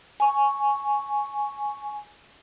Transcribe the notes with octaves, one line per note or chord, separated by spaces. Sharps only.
G#5 C#6